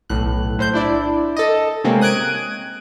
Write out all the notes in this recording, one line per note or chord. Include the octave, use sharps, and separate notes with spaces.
B1 A2 F#6
A2 C5 G6
D4 E4 D5
A4 D#5
C3 G#3 A#3 C4 C#4
D#6 F#6 G#6 D7 D#7